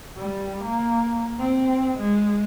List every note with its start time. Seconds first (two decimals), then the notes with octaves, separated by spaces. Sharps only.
0.17 G3
0.64 A#3
1.40 C4
1.99 G#3